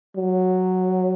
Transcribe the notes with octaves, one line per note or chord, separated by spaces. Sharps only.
F#3